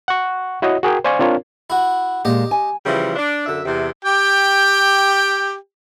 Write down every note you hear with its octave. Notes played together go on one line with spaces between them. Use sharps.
F#5 C#6
E4 F#4 C#5 D#5
F#4 G#4 A#4 G5
C5 D5 F5 G#5 C#6
C4 D4 F4 A#4 C#5
E4 F#4
A#2 G#3 G4 D#5
G#5
C#3 E3 F3 G3
D4
F#2 D3 E5
E2 C3
G4 G5